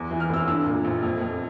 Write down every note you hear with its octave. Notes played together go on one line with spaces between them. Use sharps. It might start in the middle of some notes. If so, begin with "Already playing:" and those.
Already playing: E2
E3
F6
F1 E6
D4 E6
A#2
A#1
F2
F2